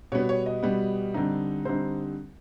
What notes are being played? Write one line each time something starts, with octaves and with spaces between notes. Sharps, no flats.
B2 G3 B3 C#5
C#5
D#5
B2 G3 B3
D3 G3 C4 D#4
D3 G3 C4 D#4 C5